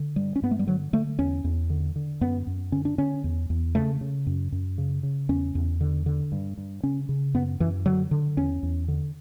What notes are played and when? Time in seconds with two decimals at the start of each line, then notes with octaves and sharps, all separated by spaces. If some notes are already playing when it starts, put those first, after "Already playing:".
Already playing: D3
0.16 G2 G3
0.36 C#4
0.42 G2 B3
0.51 A3
0.59 G3
0.67 D3 F#3
0.93 D3 A3
1.19 E2 C#4
1.44 E2
1.70 D3
1.96 D3
2.21 F#2 B3
2.47 F#2
2.72 D3 C#4
2.85 D4
2.98 D3 C#4
3.24 E2
3.50 E2
3.75 C#3 A3
4.01 C#3
4.27 F#2
4.52 F#2
4.78 C#3
5.03 C#3
5.29 E2 C#4
5.55 E2
5.81 D3
6.06 D3
6.32 G2
6.58 G2
6.83 C#3 C#4
7.09 C#3
7.34 F#2 B3
7.60 F#2 E3
7.86 D3 F#3
8.11 D3
8.37 E2 C#4
8.63 E2
8.88 D3